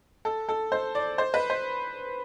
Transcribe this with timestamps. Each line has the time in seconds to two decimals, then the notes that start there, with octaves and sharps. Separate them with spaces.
0.25 A4
0.49 A4
0.72 C5
0.95 D5
1.18 C5
1.34 B4
1.50 C5